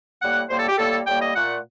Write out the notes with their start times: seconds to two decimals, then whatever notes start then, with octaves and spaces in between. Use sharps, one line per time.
0.21 A2 G3 A#3 F#5
0.49 A2 G3 A#3 C5
0.59 A4
0.69 G4
0.78 A2 G3 A#3 A4
1.06 A2 G3 A#3 G5
1.21 D#5
1.34 A#2 A3 F#5